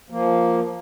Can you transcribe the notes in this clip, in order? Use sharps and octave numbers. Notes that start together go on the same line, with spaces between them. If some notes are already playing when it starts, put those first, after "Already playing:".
F3 A#3